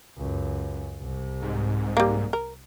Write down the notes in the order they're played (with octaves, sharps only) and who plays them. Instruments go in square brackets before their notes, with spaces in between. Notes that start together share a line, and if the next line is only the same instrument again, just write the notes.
[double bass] C#2 F#2
C2 C3
[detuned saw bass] G#2
[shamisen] G3 A#3
A#4